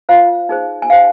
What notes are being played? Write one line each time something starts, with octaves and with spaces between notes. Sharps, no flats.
F4 C5 F5
D#4 G#4 C5
G#5
D#4 G#4 C5 F5